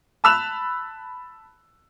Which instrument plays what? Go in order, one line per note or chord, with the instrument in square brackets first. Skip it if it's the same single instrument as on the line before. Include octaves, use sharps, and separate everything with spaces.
[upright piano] A5 B5 E6 F#6 E7 F7